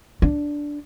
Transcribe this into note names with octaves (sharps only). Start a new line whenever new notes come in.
D4